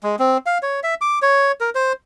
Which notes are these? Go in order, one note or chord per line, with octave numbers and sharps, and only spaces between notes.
G#3
C4
F5
C#5
E5
D6
C#5
A#4
C5